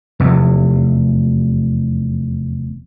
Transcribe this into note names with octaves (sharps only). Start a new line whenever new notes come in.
F1 E2